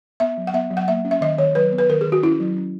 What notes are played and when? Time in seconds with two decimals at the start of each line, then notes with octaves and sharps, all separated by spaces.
0.20 B3 E5
0.38 F#3
0.47 F#5
0.54 B3 E5
0.71 F#3
0.77 F#5
0.88 A#3 E5
1.05 C#4
1.11 E5
1.21 D#3 D#5
1.38 D#3 C#5
1.55 F#3 B4
1.72 B3
1.79 B4
1.89 D#3 A#4
2.01 G#4
2.06 D#3
2.12 F#4
2.23 C#4 E4
2.40 F#3
2.57 C#4